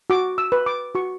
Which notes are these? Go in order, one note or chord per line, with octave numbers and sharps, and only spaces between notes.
F#4 D6
E6
B4
D6
F#4 C#6